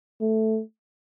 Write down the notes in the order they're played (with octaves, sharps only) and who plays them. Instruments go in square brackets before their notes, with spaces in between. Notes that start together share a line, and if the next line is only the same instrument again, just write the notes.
[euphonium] A3